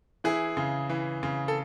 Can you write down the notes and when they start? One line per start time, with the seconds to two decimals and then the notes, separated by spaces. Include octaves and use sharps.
0.24 E3 E4 G#4
0.57 C#3
0.89 E3
1.23 C#3
1.48 A4